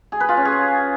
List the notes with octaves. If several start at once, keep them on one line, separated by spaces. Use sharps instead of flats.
G#4
B4
F4
C#4
G#4